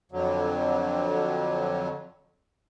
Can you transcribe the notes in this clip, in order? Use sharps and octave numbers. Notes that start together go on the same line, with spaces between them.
F2 D3 F#3